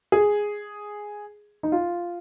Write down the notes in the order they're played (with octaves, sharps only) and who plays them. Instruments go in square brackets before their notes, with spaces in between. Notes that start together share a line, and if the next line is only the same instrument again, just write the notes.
[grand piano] G#4
D#4
F4